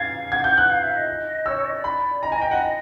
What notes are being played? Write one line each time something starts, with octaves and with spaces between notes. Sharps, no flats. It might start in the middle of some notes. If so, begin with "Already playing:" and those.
Already playing: F5 G#6 A6
F#5 G#6
G6
F#6
F5
E5
D#5
C#5 E6
C#5
D#5
D5
B5
D#5 A#5
G#5
G5
F#5
D#5